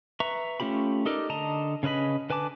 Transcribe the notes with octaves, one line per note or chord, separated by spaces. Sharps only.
B4 E5 A#5 C#6
A3 C#4 F4 G4 B5
D#4 G4 A4 A#4 D5
D3 D#5 A5 A#5
C#3 C#4 B4 D#5 B5
D3 B4 G#5 A5 D6